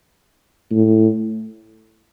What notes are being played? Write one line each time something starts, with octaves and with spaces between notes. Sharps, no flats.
A2